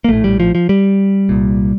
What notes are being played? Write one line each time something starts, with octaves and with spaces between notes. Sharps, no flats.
A#3
A#1 A2 A3
G3
F3
F3
G3
C2 A#2